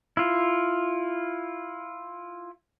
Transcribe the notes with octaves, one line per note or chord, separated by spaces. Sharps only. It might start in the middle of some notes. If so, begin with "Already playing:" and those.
E4 F4